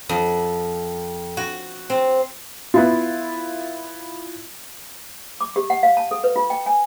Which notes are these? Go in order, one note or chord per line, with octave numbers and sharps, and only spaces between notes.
F2
F#4
C4
B3 E4 F4
D6
G4
F#5
F5
A5
A4
B4
F4
G5
G#5